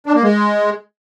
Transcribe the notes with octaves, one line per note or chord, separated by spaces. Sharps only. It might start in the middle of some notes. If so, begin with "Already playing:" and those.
D4
A#3
G#3